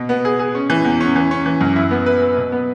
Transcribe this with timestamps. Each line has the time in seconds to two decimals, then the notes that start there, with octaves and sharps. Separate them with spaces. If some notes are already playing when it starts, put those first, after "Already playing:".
Already playing: B2
0.09 B3
0.25 G#4
0.39 G#4
0.55 C#4
0.70 E3
0.85 E2
1.00 C#4
1.16 E3
1.31 C#4
1.46 E3
1.61 F#2
1.76 E4
1.91 B3
2.06 B4
2.22 B4
2.37 B2
2.52 B3